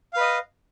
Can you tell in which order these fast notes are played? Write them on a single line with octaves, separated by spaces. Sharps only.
F5 B4 D#5